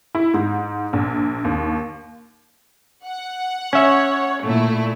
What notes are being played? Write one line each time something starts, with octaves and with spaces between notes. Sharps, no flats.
E4
G#2
A#1
D#2
F#5
C#4 C#5 E5
A#2 A3 E4